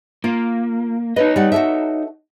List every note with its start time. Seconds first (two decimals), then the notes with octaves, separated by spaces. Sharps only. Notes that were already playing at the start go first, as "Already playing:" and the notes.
0.24 A#3 F4
1.16 D#4 B4 C#5 D#5
1.36 G3 F#5
1.52 F#4 A4 E5